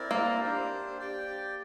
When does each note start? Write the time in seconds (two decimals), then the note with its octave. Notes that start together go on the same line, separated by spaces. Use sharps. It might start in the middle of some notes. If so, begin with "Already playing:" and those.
Already playing: C4 E4 A#4 D5
0.11 A#3
0.40 D4 G4 C5
0.98 G4 D5 G5